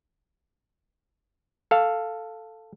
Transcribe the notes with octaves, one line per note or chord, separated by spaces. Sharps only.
A4 F5